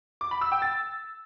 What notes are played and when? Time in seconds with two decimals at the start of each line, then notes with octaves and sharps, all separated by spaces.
0.21 D6
0.31 B5
0.41 E6
0.52 G5
0.62 A6